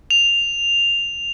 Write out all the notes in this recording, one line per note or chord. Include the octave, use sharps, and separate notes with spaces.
F7